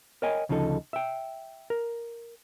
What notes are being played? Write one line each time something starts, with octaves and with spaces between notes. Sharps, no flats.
A#4 C#5 D#5 G5 G#5
D2 C#3 F3 D#4 A4
E5 G5
A#4